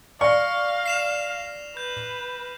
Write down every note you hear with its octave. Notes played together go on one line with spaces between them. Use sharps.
D5 F5 C#6 F6 A#6 C#7
C7 E7 F7
B4 G6